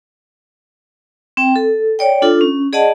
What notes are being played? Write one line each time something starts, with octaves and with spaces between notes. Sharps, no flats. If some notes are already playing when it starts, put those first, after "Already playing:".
C4 G5
A4
C#5 D5 G5
D4 F4 A4
C#4
G#4 D5 D#5 F#5 A5